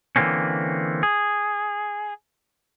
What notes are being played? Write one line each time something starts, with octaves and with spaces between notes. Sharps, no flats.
D3 E3 F#3 A#3 C4 C#4
G#4